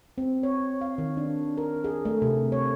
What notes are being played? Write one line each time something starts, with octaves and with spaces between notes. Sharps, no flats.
C4
C#5
F5
D#3
D4
A#4
G#4
A3
C3
C#5